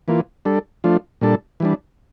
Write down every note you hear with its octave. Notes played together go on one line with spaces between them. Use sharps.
E3 A#3 F4
G3 D4 A4
F3 A3 D4 F4
A#2 G3 D4 A4
E3 G3 D4